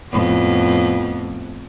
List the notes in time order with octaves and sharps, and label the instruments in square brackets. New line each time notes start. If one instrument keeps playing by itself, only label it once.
[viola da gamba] F2 A2 B3